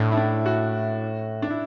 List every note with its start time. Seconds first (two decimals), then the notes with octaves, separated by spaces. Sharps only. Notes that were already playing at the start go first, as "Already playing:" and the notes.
Already playing: A2 D4
0.12 E4
0.17 D4
0.46 F#4
1.42 D4
1.50 E4